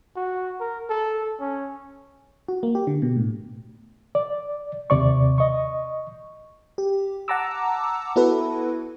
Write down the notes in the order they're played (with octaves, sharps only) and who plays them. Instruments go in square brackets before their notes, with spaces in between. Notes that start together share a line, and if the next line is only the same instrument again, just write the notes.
[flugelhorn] F#4
A#4
A4
C#4
[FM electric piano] F#4
A#3
G4
D3
B2
A2
[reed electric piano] D5
D#2 C3 D5 C#6
D#5 C#6
[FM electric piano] G4
F#5 A5 A#5 D6 E6
B3 E4 F#4 A4 B4